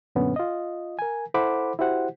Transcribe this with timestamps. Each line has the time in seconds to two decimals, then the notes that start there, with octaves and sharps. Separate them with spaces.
0.15 F#2 A#2 D3 B3 C#4
0.36 F4 D#5
0.99 A#4 G#5
1.34 E4 A4 C5 F#5 B5 D6
1.79 E4 F#4 G4 C5 F#5